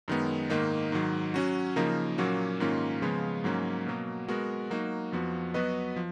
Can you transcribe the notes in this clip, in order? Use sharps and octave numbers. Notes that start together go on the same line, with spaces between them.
F#2 D#3 G#3 B3
G#2 D#3 A#3 D#4
G#2 D#3 F#3
F#3 C#4 F#4
C#3 F3 A#3 D#4 A#4
A#2 F#3 A#3 C#4 F#4
G#2 D#3 A#3 C#4 F4
C#3 F3 G#3 B3 F4
G#2 F#3 A#3 C#4
B2 F#3 A#3
G#3 B3 F#4 A#4
F#3 A#3 D#4 F#4
F2 F3 B3 F#4
F#3 B3 F#4 B4 D#5
F3